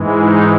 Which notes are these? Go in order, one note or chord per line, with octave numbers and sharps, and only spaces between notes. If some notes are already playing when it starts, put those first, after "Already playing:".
Already playing: G#2 E3 G#3
D#4